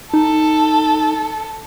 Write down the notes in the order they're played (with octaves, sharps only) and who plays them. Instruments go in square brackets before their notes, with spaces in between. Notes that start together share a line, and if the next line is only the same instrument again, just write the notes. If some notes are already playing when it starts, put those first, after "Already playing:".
[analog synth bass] D#4 [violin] A4